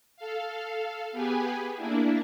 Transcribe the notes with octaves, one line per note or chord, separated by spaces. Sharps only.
A4 F5
B3 G4 G#4 B4 G#5
A#3 D4 E4